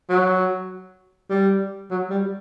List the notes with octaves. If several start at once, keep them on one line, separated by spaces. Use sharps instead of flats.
F#3
G3
F#3
G3